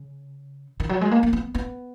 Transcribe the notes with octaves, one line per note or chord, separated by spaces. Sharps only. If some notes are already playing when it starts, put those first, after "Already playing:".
Already playing: C#3
D#3
F#3
G#3
A#3
A#3
B3
B3